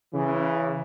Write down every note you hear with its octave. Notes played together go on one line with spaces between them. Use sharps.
C#3 E3